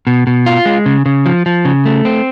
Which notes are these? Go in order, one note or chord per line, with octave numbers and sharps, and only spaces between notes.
B2
B2
F4
G#3
C#3
C#3
F3
F3
C#3
A3
C4